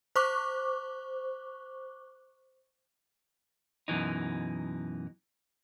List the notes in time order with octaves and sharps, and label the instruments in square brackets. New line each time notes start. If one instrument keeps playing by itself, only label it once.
[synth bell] C5 C#6 D6 F#6
[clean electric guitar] F#2 B2 E3 D#4